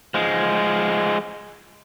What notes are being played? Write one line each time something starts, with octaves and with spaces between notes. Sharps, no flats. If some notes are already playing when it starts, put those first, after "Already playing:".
F3 G#3